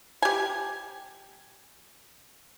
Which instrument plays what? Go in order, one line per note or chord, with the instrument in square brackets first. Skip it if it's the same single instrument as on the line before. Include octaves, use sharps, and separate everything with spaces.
[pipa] G4 G#5